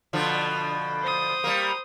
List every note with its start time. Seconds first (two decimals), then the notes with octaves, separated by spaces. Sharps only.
0.13 B2 D3 F3
1.02 C5 D#6
1.44 G3 A#3